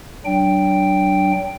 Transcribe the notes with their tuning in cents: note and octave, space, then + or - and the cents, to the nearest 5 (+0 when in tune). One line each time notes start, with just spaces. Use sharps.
F#3 +40 D4 +0 G5 +0